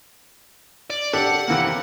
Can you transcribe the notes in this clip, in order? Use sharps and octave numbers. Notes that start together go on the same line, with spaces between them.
D5
D4 G4 A4 F#5
C3 E3 A#3